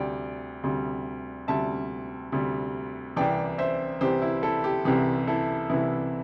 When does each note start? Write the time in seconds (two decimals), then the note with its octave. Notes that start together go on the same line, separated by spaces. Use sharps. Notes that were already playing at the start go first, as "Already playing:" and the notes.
Already playing: D2 C3 G3 D5 G5
0.63 D2 C3 G3
1.48 D2 C3 G3 E5 A5
2.32 D2 C3 G3
3.16 C2 C3 E3 D5 G5
3.58 C5 E5
4.01 C2 C3 E3 G4 C5
4.22 E4
4.43 E4 A4
4.64 G4
4.85 C2 C3 E3 G4
5.27 E4 A4
5.69 C2 C3 E3 E4